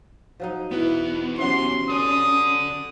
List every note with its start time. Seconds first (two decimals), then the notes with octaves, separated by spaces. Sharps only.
0.40 F3 F#3 D#4
0.71 E2 B2 B3 E4 B4
1.38 C3 F#3 C#4 C6
1.90 A4 D5 D#6